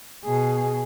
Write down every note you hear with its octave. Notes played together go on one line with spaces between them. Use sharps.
B2 G#4